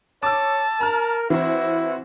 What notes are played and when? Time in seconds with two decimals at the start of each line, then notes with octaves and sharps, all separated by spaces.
0.23 C#5 A5 D6 E6
0.81 A#4 A#5 F6
1.30 E3 C4 E4 F#4 C5